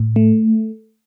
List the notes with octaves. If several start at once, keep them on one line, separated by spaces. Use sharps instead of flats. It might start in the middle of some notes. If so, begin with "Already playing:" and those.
Already playing: A2
A3